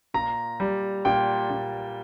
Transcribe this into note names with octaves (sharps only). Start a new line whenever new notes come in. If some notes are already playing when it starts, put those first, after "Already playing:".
A#2 A#5
G3
A#2 G5
A#2